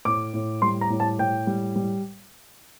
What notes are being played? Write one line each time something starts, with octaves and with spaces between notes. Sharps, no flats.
A2 D6
A2
G3 C6
A#5
A2
A5
A2 G5
G3
G3